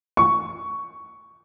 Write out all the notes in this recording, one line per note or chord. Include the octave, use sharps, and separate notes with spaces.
C#6